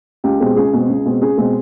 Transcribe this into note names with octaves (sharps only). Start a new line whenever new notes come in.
C#2 G4
B2 G#3 C4
C#2 G#4
B2 G#3 C4
C#2
B2 G#3 C4
C#2 G#4
B2 G#3 C4